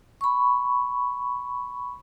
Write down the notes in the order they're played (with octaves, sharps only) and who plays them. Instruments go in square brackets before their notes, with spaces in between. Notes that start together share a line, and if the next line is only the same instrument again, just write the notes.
[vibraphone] B5 C#6